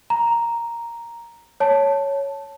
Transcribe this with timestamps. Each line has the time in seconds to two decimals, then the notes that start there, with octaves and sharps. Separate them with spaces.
0.10 A#5
1.60 C#5 A5